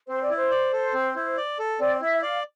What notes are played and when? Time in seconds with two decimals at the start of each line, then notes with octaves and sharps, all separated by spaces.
0.09 C4 C5
0.22 D5
0.30 E4
0.36 C5
0.51 D5
0.73 A4
0.94 C4
1.16 E4
1.37 D5
1.59 A4
1.80 C4 D5
2.01 E4 E5
2.22 D5 F5